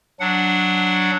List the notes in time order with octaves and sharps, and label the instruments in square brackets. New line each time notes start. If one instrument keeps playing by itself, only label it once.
[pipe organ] F#3 D4 F#5